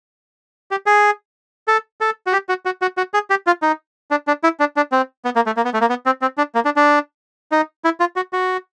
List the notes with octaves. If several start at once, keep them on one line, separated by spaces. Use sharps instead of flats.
G4
G#4
A4
A4
F#4
G4
F#4
F#4
F#4
F#4
G#4
G4
F4
D#4
D4
D4
E4
D4
D4
C4
B3
A#3
A3
A#3
B3
A3
A#3
B3
C4
C4
D4
A#3
D4
D4
D#4
E4
F4
F#4
F#4